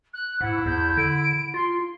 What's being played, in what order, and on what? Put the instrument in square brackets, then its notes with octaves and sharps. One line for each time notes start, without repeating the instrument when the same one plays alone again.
[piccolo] F#6
[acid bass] G#2 [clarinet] E4 [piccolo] F#5
[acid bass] E2 [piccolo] G6
[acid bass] D3 [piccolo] D7
[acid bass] F4 [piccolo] C6